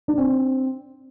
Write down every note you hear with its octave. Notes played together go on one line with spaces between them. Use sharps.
D4
C4